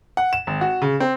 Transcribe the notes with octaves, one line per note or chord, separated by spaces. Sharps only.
F#5
E7
G#1
F#4
C#3
C4